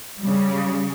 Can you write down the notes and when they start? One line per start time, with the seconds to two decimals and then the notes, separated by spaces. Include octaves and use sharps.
0.21 C#3 G3